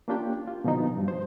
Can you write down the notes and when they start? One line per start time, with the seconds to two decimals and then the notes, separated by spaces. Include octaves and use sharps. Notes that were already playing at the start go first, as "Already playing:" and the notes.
0.08 A#3 C#4 D4 F4 G4 G5
0.47 F4
0.64 B2 D3 F3 B3 D#4
0.96 G2 F3
1.08 C5